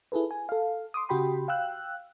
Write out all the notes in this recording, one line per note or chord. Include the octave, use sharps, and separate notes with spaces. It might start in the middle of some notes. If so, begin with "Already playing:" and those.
E4 G#4 A4 B4
G#5
A4 F5
C6 D6 D#6
C#3 F#4 G4 G5 B5 C6
F5 G5 E6 F#6